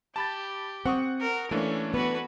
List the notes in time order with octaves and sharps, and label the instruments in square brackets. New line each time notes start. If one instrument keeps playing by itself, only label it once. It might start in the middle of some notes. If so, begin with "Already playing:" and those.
[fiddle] G4 [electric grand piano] A5 B5 A6
[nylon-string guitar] C4 [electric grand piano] F#5 C#6 D#6
[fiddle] A#4
[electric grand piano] E3 A3 D4 [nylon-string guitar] A#3 [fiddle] C#4
[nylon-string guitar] B3 [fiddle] F#4 B4